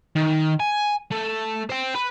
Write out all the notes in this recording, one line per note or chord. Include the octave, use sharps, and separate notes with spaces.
D#3
G#5
A3
C5 G5
B4